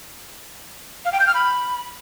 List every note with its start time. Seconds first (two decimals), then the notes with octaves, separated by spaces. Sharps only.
1.05 F5
1.12 G5
1.20 G6
1.27 F6
1.34 B5